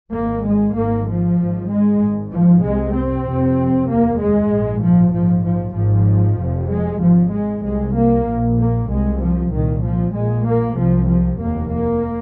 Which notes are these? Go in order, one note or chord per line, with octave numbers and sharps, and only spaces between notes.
G#1 G#2 A#3
G#3
G#1 G#2 A#3
F3
G#1 G#2
G#3
G#1 G#2
F3
C2 C3 G#3
C4
F1 F2 C3
F1 D#2 A#3
G#3
A#1 G#2
F3
A#1 G#2 F3
F3
G#1 G#2 F3
F1 F2 C3
G#3
G#1 G#2 F3
G#3
C2 C3 G#3
A#3
A#1 A#2
A#3
C2 C3 G#3
F3
C2 A#2 D#3
F3
A#1 A#2 G#3
A#3
C2 C3 F3
F3
F1 D#2 A#3
A#3